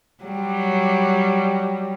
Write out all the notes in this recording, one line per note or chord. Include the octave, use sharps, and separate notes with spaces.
F#3 G3